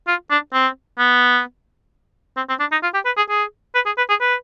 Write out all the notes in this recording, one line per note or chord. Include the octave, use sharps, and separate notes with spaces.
F4
D4
C4
B3
C4
C4
D4
D#4
F4
G4
B4
G#4
G#4
B4
G#4
B4
G#4
B4